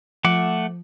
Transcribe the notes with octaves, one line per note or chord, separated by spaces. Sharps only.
F3 A3 F#5 D6